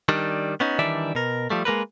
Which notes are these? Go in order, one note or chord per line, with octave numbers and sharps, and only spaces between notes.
D#3 G3 D4
B3 C#4 D#4
D#3 E3 G3 D4 D5 E5
B2 A#4
F3 G3 A3
G#3 A#3 A#4 B4